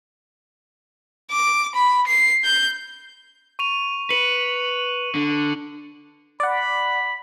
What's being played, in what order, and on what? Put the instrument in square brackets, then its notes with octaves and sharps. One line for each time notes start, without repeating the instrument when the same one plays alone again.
[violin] D6
B5
C7
G6
[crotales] C#6 D#7 F7
[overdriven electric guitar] B4 [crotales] C#7 D#7 F#7
[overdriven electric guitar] D3
[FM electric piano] D5 F#5 [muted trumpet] B5